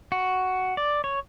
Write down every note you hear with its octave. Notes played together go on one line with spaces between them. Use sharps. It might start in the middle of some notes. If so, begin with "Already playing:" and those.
F#4
D5
C#5